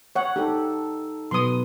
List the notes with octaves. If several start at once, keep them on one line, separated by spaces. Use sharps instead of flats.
C#5 F#5
D#4 G4 A4
B2 F#3 B4 C6 D#6